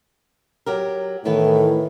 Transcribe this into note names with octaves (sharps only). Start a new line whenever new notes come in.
F#3 G4 A#4
A2 D#3 E3 B3 B4